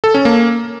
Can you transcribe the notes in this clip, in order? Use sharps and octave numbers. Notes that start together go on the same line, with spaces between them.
A4
C#4
A#3